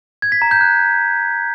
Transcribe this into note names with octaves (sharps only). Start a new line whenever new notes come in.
G#6
B6
A#5
G6
F#6